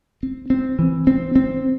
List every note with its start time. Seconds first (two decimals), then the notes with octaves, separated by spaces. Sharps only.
0.23 C4
0.50 C4
0.79 E3
1.07 C4
1.36 C4